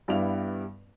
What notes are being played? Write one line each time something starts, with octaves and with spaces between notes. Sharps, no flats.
G2 G3 B3 E4 F5 F7